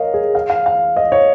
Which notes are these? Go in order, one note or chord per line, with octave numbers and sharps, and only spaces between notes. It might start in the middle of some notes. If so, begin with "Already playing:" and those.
Already playing: A#4 C#5 D#5 F5
G#4
F5
F5
F5
D#5
C#5